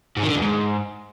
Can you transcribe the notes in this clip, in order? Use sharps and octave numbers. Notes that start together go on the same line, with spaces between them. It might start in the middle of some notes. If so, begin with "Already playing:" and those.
G#2
D#3
D3
E2
G#2